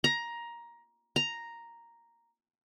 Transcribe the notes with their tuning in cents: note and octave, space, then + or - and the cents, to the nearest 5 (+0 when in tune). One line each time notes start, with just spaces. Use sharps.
A#5 +15
A#5 +0